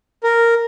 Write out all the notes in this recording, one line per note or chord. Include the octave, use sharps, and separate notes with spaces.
A#4